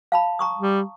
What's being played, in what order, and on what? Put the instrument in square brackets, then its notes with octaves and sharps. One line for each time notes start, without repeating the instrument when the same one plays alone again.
[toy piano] F5 A5 B5
A#5 C#6 D#6
[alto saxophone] G3